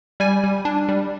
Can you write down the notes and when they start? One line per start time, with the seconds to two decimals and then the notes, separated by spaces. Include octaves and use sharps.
0.20 G3 G#5
0.44 G3
0.65 D4
0.89 G3